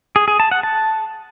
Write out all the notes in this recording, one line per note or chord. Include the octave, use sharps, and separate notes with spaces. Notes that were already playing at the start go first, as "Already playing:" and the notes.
G#4
G#4
A5
F#5
A5